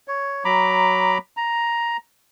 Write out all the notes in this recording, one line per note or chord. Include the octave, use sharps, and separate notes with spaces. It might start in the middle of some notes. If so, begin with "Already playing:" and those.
C#5
F#3 A#5 B5 D6
A#5